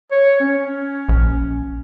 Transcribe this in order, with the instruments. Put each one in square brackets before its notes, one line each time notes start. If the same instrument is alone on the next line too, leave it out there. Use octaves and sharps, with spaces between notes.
[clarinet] C#5
C#4
[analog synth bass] A#1